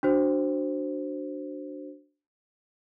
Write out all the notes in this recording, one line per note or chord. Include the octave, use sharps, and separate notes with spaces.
D4 F#4 C5